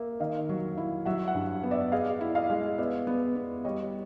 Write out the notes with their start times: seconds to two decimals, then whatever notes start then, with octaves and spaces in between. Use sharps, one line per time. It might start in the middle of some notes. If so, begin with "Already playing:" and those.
Already playing: A#3 E5
0.20 D#3 D#5 F5
0.49 F#3
0.77 E4
1.06 F#3 E5 F#5
1.28 E5 F#5
1.35 G2
1.63 B3
1.71 D5 E5
1.92 G#4 D#5 F5
2.21 E4
2.35 D#5 F5
2.50 G#3
2.78 B3 D5 E5
3.07 B3
3.36 B3
3.65 G3 C#5 D#5